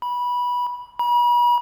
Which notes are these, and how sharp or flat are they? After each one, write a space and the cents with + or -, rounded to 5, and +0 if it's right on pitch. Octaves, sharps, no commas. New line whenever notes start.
B5 -15
B5 -40